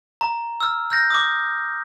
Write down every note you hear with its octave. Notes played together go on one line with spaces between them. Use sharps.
A#5
E6 F6
F6 G6 A#6
D6 D#6